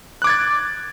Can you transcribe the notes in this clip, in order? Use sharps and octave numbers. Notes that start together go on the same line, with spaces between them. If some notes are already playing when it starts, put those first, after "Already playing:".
D6 F#6 G#6 A6